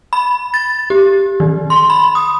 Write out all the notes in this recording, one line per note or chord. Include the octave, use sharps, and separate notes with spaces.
B5
A6
G4
D#3
C6
B5
D#6